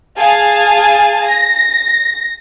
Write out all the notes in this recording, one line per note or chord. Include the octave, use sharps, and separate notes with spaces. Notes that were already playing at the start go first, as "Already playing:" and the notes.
G#4 F5 G#5 A5
A#6